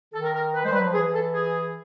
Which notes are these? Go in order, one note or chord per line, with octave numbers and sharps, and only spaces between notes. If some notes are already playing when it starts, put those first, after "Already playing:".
D#3 A4
A#4
A#4
B4
G#3 C5
G3 B4
F#3
F3
E3 G#4
A4
G#4